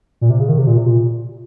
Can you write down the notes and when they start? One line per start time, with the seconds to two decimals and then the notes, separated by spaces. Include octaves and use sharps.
0.21 A#2
0.30 C3
0.39 C#3
0.49 D#3
0.59 C3
0.67 A#2
0.77 C3
0.86 A#2